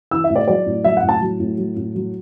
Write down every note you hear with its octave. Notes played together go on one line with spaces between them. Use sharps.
E3 E6
E5
A2
D5
F#3 D5
A2
F#3 E5
F#5
A2
A5
F#3
A2
F#3
A2
F#3